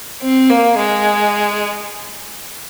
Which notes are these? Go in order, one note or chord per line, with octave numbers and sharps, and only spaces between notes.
C4
A#3
G#3